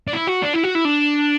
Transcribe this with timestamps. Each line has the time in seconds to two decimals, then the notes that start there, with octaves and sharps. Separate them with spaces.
0.08 D4
0.13 E4
0.27 F#4
0.42 D4
0.53 E4
0.63 F#4
0.75 E4
0.85 D4